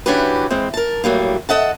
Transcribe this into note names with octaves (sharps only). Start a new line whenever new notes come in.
E3 C#4 D4 F#4 G4 B4
E3 G#3 C4
A#4 A5
A2 F#3 G3 A#3
A4 D#5 F#5 A5